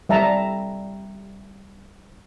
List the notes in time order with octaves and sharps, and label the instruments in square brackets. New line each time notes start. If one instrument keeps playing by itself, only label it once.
[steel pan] G3 E5 A5 A#5